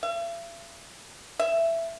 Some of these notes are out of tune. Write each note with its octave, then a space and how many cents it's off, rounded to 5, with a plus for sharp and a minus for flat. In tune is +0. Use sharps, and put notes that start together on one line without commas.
E5 +45
E5 +10